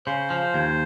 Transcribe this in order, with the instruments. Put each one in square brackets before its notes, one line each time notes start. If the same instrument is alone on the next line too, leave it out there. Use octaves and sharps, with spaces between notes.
[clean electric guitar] C#3 [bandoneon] C5
[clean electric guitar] F3
D#2